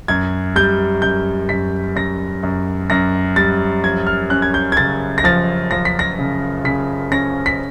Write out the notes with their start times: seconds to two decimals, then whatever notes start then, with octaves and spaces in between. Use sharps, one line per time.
0.08 F#2 G#6
0.56 G3 G6
1.02 F#2 G6
1.49 F#2 B6
1.96 F#2 A#6
2.43 F#2
2.90 F#2 A#6
3.36 G3 A6
3.83 F3 G#6
4.07 F6
4.30 C#4 F#6
4.42 G#6
4.54 G6
4.72 G#6
4.77 C#3 A6
5.18 A#6
5.24 F3 A6
5.71 F3 A#6
5.85 B6
5.99 A#6
6.19 C#3
6.64 C#3 B6
7.12 C#4 A#6
7.46 B6